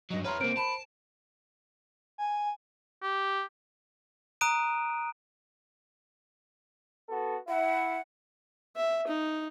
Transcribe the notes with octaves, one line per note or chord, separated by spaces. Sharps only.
G2 F#3 D#5
E2 B4 C#5 A#5 C6 F6
C3 A#3 A#4 C5 D7
A5 B5
G#5
G4
A#5 D#6 F#6 D7 D#7
B3 F#4 A4
E4 F#5
E5
D#4